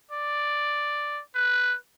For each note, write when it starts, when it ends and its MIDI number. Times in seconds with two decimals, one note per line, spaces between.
0.12 1.21 74
1.35 1.75 71